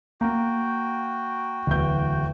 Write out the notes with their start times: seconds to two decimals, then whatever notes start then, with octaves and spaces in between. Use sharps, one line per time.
0.21 A#3 F#4 G5
1.67 D1 E2 G6